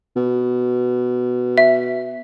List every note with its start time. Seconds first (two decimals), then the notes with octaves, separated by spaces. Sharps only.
0.16 B2
1.58 E5